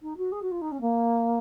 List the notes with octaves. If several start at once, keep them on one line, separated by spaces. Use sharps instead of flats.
D#4
F#4
G#4
F#4
F4
D#4
C#4
A#3